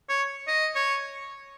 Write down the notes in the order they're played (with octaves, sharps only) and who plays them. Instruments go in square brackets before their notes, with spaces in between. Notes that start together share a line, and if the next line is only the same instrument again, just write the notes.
[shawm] C#5
D#5
C#5